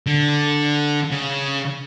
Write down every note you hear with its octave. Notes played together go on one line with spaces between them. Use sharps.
D3
C#3